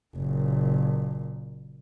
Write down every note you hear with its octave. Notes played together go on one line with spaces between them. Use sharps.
F#1 A#2